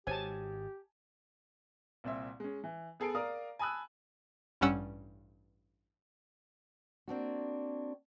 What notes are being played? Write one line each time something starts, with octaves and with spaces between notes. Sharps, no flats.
G#1 G#2 G4 C5 C#5 G#5 A5
C2 A#2 C4 E5
G#3 C#4
E3
B3 G#4 A4 C7 D7
A#4 D5 F5 A#5 D#6
G#5 A5 B5 D#6 E6 F#6
A1 G2 G3 C#4 F#5 E6
A#3 C4 D4 F#4